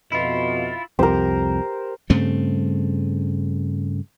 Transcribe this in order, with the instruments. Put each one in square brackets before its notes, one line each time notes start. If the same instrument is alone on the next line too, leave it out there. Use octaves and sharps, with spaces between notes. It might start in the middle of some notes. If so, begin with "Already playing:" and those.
[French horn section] F2 B2 D#5 [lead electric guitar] E4 F4
[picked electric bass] C2 F2 [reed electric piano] G4 [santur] A#4 C5
[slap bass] G2 C#3 A3 C4